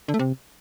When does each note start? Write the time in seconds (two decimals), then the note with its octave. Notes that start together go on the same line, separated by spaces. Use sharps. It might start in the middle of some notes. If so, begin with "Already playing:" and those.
0.08 D3
0.14 A3
0.19 C3